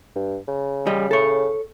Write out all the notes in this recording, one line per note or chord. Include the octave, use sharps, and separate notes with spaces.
G2
C#3
G3 D#5
A4 C#5